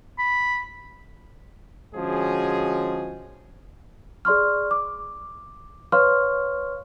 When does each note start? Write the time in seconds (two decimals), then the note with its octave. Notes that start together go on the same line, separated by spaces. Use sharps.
0.18 B5
1.95 D3 F3 G#3 C#4 F#4 G#4
4.25 G#4 D5 C6 C#6 F6
4.71 D6
5.92 B4 C#5 F5 C6 C#6 F6